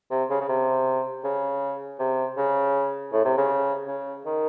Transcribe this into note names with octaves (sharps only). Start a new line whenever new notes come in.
C3
C#3
C#3
C3
C#3
C3
C#3
A2
C3
C#3
C#3
D#3